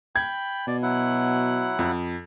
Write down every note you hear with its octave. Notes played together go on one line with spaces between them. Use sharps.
G5 B5 G#6
B2 D5
F#3 E4 F#5
F2